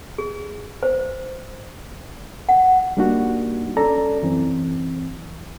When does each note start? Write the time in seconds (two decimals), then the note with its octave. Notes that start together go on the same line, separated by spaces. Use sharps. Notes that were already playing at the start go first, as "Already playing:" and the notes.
0.18 G#4
0.83 C5
2.49 F#5
2.97 G3 A#3 D4 D#4 F#4
3.77 C#4 A4 D5 A#5
4.23 F#2 E3 C4